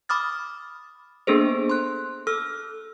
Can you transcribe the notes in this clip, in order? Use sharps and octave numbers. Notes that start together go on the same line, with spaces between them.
B5 D6 D#6 F6 A6
A#3 B3 D4 G#4 A4 C5
C6 F#6
A4 E6 F6